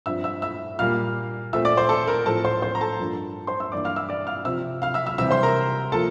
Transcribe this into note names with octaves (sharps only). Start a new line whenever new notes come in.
G2 F3 C4 E5 E6
E5 E6
E5 E6
A#2 G3 A#3 F5 F6
A#2 A3 C4 E5 E6
D5 D6
C5 C6
A4 A5
A#4 A#5
A2 F3 C4 A4 A5
C5 C6
C5 C6
A#5
A4 A5
G2 F3 A#3
C5 C6
E5 E6
G2 E3 A#3 D5 D6
F5 F6
E5 E6
D5 D6
F5 F6
C3 F3 C4 E5 E6
F5 F6
E5 E6
E5 E6
C3 E3 G3 C4 E5 E6
C5 C6
A#4 A#5
F3 A#3 A4 A5